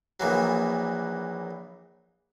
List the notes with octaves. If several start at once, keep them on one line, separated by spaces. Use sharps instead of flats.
A#1 A#2 E3 F#3